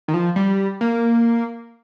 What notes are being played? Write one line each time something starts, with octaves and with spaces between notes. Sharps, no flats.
D#3
F3
G3
A#3